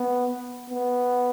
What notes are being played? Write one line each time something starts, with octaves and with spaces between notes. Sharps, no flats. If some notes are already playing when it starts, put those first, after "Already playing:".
Already playing: B3
B3